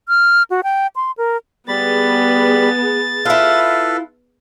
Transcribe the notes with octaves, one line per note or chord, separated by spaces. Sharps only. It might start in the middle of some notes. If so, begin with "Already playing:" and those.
F6
F#4
G5
C6
A#4
G3 B3 G#4 B5 A6
E4 F4 A4 B4 F5